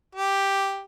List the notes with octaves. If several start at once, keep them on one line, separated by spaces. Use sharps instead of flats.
G4